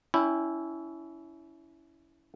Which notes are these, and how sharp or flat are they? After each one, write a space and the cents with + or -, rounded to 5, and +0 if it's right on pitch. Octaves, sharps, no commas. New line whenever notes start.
C#4 +35 E4 +0 G5 +30